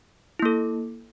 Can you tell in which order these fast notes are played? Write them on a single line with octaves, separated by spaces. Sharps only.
E4 A#3 A4